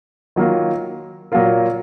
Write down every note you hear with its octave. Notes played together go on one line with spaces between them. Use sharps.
D#3 F#3 A#3 F4
A#2 F#3 A#3 F4 A#4